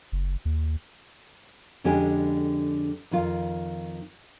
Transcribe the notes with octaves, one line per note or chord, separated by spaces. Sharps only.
F#1
D#2
F2 D3 G#3 C#4 G4 G#5
F2 D#3 F4